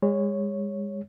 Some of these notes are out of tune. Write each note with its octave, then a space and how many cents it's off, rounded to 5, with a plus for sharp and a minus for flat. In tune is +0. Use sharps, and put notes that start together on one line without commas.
G#3 -35 C#5 +0